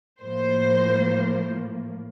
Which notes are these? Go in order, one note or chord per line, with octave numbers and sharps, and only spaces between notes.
A2 F3 A#3 C5